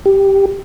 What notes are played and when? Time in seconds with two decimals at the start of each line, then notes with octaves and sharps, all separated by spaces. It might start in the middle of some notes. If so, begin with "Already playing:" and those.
0.06 G4